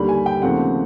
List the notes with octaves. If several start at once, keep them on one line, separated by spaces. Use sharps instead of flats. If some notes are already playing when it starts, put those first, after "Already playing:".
Already playing: D#2 D3 G3 B5
G#5
G5
D#2 C#3 F3 A3 C4 F#5